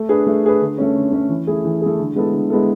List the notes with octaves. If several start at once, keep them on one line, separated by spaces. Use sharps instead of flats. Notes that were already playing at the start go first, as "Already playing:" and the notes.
Already playing: A3
D4 G#4 B4
A3
D4 G#4 B4
D3
A3 C#4
D3
A3 C#4
E3
A3 E4 G#4
E3
A3 E4 G#4
D3
G#3 B3 E4 A4
D3
G#3 B3 E4 A4